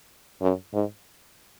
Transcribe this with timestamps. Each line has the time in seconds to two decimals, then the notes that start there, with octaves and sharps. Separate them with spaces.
0.42 F#2
0.74 G#2